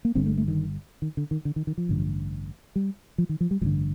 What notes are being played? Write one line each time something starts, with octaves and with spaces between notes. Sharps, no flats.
A#3
G1 G2 D3 C4
A3
A3
D#3
D#3
D3
D#3
D3
D#3
D#3
F3
A1 G2 D3
G3
F3
D#3
F3
G3
A1 G2 D3 F3